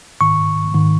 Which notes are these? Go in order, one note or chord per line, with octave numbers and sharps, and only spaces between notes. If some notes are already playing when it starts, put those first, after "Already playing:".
G#2 D#3 C#6
G#2 D#3